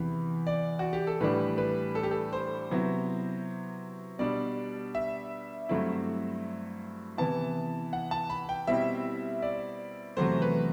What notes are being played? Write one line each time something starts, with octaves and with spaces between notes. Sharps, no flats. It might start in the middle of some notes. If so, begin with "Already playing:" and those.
Already playing: E2 C3 E3 B5
D5
F#4
G4
A4
A2 E3 G3 D4 B4
B4
A4
G4
A4
C5
C3 F#3 B3 E4
B2 G3 D4 D5
E5
G2 F#3 A3 C4 E4
C3 E3 B3 E4 A5
F#5
A5
B5
G5
B2 G3 C4 E4 E5
D5
E2 C3 F#3 A3 C5
B4